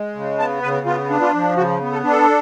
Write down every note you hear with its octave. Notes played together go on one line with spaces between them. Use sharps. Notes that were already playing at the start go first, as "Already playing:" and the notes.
Already playing: G#3
C#3
B3 A5
C#3 B4
B3 F4
D4
F4
F3
C#3 F#4
B3
A4
D4
A4